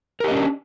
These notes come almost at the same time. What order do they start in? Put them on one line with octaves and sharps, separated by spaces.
A#4 G4 D#5 C#4 D4